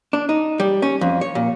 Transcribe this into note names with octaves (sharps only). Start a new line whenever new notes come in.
D4
D#4
G3
C#4
F2
C#5
A#2